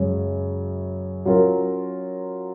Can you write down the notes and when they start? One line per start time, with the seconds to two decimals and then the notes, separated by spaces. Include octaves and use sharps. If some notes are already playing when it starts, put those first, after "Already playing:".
Already playing: F#2 C#3 G#3
1.25 F#3 C#4 F4 A#4